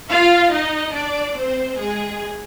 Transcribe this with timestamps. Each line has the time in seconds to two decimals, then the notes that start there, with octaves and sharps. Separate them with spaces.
0.10 F4 F5
0.52 D#4 D#5
0.94 D4 D5
1.37 C4 C5
1.79 G#3 G#4